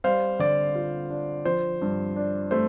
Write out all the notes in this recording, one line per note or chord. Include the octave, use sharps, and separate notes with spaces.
G3 C5 F5
D3 D5
F4
D4
F3 C5
G2
D4
A3 C5